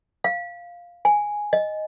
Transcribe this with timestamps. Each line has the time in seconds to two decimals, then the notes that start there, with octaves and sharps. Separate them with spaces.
0.24 F5
1.05 G#5
1.53 D#5